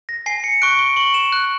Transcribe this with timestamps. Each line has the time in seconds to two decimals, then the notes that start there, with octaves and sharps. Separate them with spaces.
0.09 A#6
0.26 G#5 C7
0.44 C#7
0.62 C#6 F#6 D7
0.79 G7
0.96 C#6 F#7
1.14 E7
1.32 F#6